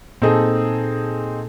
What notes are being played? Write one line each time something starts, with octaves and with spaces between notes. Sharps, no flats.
A#2 C4 D#4 G#4 A4